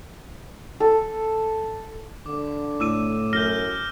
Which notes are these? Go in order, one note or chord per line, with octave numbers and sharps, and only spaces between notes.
A4
D3 D6
A2 D6 E6 D#7 E7
F#2 F6 G6 A#6 G7